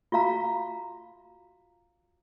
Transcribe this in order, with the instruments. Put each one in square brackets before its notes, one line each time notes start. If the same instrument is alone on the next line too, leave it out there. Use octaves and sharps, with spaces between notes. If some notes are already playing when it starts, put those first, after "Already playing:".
[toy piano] F4 F#4 F5 A#5